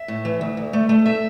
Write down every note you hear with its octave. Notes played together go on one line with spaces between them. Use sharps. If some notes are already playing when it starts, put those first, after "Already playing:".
Already playing: E5
A2
E3
D2
D2
A3
A3
E5